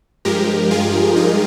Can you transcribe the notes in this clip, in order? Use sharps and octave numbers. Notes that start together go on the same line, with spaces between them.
G2 F3 G#3 G4 A#4
F4 G#4
D#4